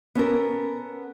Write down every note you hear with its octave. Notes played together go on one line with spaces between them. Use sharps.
B3 C#4 A4 A#4